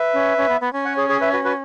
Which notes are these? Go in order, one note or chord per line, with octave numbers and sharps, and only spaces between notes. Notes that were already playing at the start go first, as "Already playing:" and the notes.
Already playing: B4 E5
C#4
C#4
B3
B3
C#4
C#5 F#5
G#4 C#5
G#4 C#5
B4 E5
F#4 B4
F#4 B4